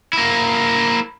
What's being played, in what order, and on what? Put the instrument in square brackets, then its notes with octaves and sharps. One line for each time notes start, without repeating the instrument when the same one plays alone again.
[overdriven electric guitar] A#3 E4